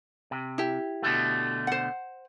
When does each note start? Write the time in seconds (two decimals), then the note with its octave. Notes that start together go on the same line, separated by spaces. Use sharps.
0.31 C3
0.58 E4 G4
1.02 B2 D3 A3
1.67 C5 F#5